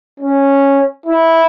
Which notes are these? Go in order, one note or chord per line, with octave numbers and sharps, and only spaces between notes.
C#4
E4